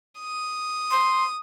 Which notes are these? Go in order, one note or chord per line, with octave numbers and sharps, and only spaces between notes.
D#6
C6